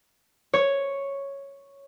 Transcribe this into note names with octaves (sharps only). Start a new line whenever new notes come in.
C#5